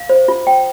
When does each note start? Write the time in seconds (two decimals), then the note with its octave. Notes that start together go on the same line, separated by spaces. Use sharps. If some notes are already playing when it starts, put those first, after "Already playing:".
Already playing: F5
0.09 C5
0.28 F4
0.47 G5